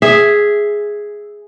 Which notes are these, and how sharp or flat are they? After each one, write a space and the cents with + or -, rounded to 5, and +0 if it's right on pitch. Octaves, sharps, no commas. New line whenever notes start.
G#4 +0 E5 +0